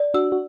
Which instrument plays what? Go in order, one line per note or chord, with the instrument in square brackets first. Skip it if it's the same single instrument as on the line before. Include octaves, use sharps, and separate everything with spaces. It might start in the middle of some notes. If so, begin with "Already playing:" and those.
Already playing: [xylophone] D5
[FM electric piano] D4 F#4 [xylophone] E6
[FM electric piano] F#4